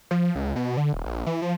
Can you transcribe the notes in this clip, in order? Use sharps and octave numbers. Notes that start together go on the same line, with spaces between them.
F3
C#2
B2
D3
D#1
A#1
E3
F3